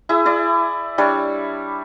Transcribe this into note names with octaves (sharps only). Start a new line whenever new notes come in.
E4 G#4 E5
E4 D5
G3 D4 C#5